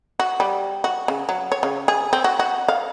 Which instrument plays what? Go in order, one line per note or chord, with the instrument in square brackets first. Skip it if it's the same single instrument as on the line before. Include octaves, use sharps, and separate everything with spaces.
[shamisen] F#4
G3
F#4
C#3
F#3
C#5
C#3
G#4
C4
F#4
F#4
F5